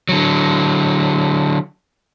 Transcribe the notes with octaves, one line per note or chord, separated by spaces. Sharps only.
D3 F#3